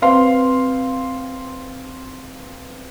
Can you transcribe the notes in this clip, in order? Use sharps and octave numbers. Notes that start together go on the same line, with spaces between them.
C4 B4 F5 C6